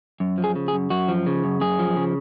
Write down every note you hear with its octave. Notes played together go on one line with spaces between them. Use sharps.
F#2
F3
G#4
C#3
G#4
F#2
F#2 F#4
F3
C#3
F#2
F#2 G#4
F3
C#3